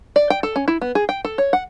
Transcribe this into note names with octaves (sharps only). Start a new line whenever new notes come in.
D5
G5
A4
C#4
E4
B3
G#4
G5
A4
C#5
F#5